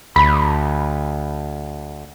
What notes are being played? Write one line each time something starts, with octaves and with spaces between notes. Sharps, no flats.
D2 B5